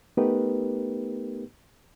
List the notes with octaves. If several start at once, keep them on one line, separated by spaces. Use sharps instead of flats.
A3 B3 D#4 G4 A#4 B4